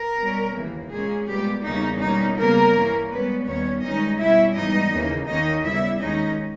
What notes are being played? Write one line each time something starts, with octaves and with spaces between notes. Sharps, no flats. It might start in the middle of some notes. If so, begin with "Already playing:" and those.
Already playing: A#4
B2 G3 C#4
D#2 C#3 E3 A#3
A#2 G#3 A#3 C#4 G#4
A#2 G3 G#3 B3 G4
E2 C#3 G3 A#3 C#4 D#4
B2 G3 A#3 C#4 D#4
C#3 G3 A#3 B3 A#4
G2 E3 A#3 C#4
G#2 G3 B3 C#4 B4
D#2 D#3 G3 B3 C#4 C#5
G2 D#3 G#3 C#4 D#4 D#5
B2 G3 C#4 E4 E5
G#2 E3 G3 B3 D#4 D#5
D#2 C#3 E3 A#3
D#2 D#3 A#3 C#4 D#4 D#5
C#3 G3 B3 E4 E5
D#2 D#3 G#3 C#4 D#4 D#5